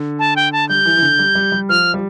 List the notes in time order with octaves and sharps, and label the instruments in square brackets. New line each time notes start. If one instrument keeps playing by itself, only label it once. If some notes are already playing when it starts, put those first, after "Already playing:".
Already playing: [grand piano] D3
[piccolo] A5
G5
A5
[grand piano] G3 [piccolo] G6
[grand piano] E3
E3
D3
G3
G3
G3
[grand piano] F3 [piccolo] F6
[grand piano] G3